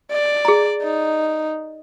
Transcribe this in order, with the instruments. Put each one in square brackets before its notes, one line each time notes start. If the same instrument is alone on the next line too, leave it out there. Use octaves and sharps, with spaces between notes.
[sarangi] D5
[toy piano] G#4 A#5
[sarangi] D#4